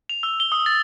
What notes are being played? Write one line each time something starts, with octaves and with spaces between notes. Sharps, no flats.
F7
E6
G7
D#6
A6